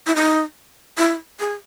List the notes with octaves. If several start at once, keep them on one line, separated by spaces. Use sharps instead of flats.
E4
D#4
E4
G#4